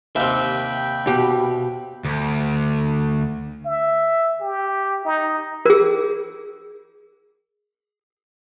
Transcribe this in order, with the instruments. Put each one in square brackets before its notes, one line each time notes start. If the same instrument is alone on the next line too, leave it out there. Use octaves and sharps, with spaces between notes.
[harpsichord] D#2 C3 [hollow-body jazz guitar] E5 [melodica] G5 B5
[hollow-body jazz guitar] B2 G4
[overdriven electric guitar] D2
[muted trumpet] E5
G4
D#4
[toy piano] G#4 A#4